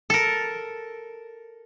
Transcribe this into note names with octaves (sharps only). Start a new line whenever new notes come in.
A4 A#4